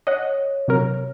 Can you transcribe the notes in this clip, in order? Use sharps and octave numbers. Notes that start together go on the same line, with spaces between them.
C#5 D#5 F#5
C3 F#3 A#4